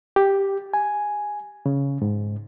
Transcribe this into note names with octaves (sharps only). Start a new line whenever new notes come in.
G4
G#5
C#3
G#2